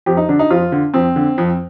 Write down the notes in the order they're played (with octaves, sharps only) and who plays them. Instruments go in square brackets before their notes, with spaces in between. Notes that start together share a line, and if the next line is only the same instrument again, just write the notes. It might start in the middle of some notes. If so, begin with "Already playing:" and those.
[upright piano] F2 G4
D#4
D3 D4
D#4
F2 F4
D3
F2 C4
D3
F2